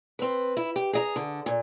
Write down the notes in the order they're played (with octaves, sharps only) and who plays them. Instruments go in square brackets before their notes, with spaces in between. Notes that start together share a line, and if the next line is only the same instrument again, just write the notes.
[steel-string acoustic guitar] C4 B4
E4
G4
G#4 D#5 A#5
D3
A#2